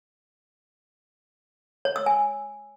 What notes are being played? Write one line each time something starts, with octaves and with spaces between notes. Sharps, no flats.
C#5
E6
G#5